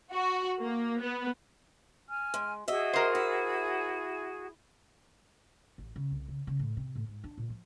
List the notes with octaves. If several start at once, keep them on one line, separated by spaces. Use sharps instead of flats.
F#4
A#3
B3
G#5 F6
G#3
F#4 G#4 D#5 E5
A#4 C5
E4
A1
C#3
C2
C#3
C#3
A2
C3
A2
G#2
D4
A#2
F3